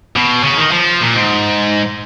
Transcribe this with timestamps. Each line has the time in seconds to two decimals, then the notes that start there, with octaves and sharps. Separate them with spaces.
0.16 B2
0.44 C#3
0.58 D#3
0.72 F3
1.01 A#2
1.15 G#2